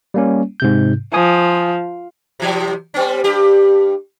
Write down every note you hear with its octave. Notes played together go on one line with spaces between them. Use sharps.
G3 A#3 C#4
G#2 C3 G6
F3 G#5 D#6
C3 E3 F#3
G3 B3 C#4
G2 G4